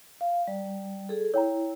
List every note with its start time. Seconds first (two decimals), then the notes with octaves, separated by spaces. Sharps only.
0.21 F5
0.47 G3 D5
1.09 G#4 A4
1.34 E4 C#5 G5 A#5